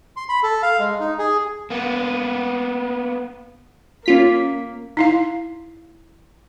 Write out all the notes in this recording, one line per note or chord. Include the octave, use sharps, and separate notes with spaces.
C6
B5
A4
F5
G#3
D#4
G#4
A#3 B3
A#3 C#4 F4 B6
D#4 E4 F5